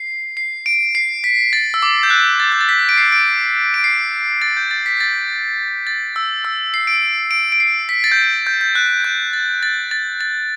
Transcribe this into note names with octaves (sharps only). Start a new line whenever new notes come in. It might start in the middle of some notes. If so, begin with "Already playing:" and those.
Already playing: C7
C7
D7
C7
B6
A6
E6
D6
G6
F#6
A6
G6
A6
B6
D7
C7
D7
D7
C7
A6
G6
A6
B6
A6
A6
E6
E6
C7
D7
D7
D7
C7
B6
A6
G6
A6
G6
G6
F#6
G6
A6
A6
A6
A6